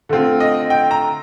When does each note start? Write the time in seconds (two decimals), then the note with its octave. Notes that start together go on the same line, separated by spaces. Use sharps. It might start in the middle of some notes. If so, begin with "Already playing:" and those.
0.09 D3 A3 C4 F4
0.40 D#5
0.70 G5
0.91 A#5